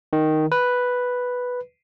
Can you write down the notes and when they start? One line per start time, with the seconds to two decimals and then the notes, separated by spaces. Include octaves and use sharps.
0.13 D#3
0.52 B4